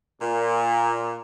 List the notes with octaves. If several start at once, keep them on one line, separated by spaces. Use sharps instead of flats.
A#2